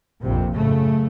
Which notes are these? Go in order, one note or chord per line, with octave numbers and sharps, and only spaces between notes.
A#1 F2 C3
F#2 A2 C#3 A3